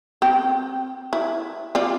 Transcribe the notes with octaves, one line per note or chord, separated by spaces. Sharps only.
C4 G5
E4
C4 F4 D5